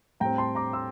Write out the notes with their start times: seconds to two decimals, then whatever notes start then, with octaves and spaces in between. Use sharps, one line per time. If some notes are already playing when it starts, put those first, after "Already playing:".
0.20 A2 G3 C4 G5 A#5
0.38 A5 C6
0.55 A#5 D6
0.73 C6 E6